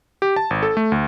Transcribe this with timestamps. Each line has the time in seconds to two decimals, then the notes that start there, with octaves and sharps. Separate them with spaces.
0.22 G4
0.36 A5
0.50 G#1
0.63 A4
0.77 A3
0.92 D2